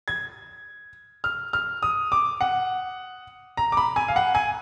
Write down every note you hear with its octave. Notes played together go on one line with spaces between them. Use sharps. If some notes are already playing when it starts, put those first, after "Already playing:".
G#6
F6
F6
D#6
D6
F#5
A#5
D6
B5
G#5
F5
F#5
G#5